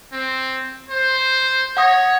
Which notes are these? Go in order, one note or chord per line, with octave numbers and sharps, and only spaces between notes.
C4
C5
C#5 F#5 D#6 A#6